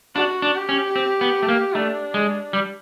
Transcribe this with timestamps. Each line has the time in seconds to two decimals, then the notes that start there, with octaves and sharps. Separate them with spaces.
0.15 D4 F#4
0.42 D4
0.55 G4
0.69 C#4
0.96 C4
1.21 B3
1.43 A3
1.49 A#3
1.74 A3 D4
2.14 G#3
2.53 G3